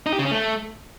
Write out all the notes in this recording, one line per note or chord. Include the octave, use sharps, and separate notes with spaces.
D#4
G4
C#3
C#4
A3